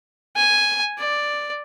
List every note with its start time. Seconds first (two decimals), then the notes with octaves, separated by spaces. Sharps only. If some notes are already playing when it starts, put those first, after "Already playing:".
0.36 G#5
0.98 D5